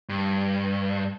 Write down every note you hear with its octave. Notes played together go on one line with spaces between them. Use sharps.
G2